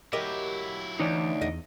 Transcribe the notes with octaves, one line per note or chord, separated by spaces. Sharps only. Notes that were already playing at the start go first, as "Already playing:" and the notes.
F#3 E4 G4 A#4 D#5
D2 E3 D#4 C#5 D5
E2 D#5